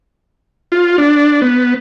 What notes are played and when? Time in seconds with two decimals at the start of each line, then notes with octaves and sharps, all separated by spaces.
0.72 F4
0.98 D4
1.42 B3